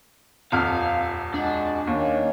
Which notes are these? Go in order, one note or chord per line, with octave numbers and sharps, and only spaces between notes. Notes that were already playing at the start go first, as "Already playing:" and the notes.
D#1 F2 F5 F6
G#3 D4 F#4
D#2 D#3 A#3 C#4